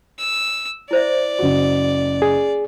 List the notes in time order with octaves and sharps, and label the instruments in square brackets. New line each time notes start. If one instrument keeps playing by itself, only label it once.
[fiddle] E6
[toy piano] E4 C5 E5 [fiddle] D5
[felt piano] F#1 F#4
[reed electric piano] G#4